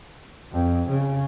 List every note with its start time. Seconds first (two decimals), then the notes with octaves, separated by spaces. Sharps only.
0.52 F2
0.88 C#3